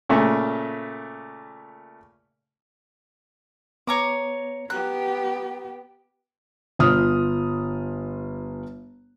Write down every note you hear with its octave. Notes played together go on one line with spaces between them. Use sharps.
A#2 C#3 A3
B3 C#5 A#5 D6
B3 G4 A#5 F#6
G1 F4 D#6 F6